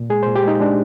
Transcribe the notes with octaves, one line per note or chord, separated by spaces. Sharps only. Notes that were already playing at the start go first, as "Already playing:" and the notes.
Already playing: A#2
G#3 G#4
A#2 C5
G4
G#3 D#4
G#3 D4